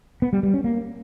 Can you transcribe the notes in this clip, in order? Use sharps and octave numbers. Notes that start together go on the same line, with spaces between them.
B3
G3
G3
C#4
A#3